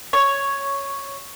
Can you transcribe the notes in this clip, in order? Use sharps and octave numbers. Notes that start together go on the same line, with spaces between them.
C#5